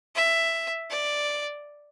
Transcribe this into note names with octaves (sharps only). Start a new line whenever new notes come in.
E5
D5